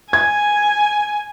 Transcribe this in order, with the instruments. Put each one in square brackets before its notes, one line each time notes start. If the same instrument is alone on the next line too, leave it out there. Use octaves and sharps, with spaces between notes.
[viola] G#5 [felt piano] G#6